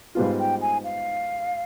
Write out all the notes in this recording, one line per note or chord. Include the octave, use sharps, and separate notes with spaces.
G#2 G3 B3 F4 F5
G5
G#5
F5